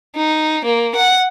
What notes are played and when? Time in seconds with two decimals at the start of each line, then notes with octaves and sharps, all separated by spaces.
0.16 D#4
0.65 A#3
0.96 F#5